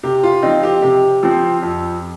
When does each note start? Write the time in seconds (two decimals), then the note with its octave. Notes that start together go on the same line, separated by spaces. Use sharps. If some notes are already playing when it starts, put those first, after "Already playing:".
0.03 C3 G4
0.23 F4
0.43 F3 C4 D#4
0.63 G4
0.82 C3 G4
1.23 F3 C4
1.63 F2